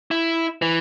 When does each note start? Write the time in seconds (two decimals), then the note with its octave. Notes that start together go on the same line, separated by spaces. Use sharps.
0.11 E4
0.62 E3